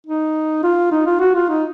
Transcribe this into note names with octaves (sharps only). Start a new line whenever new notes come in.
D#4
F4
D#4
F4
F#4
F4
D#4